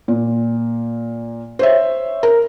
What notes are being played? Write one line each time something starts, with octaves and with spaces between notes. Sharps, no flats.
A#2
C5 C#5 E5
A#4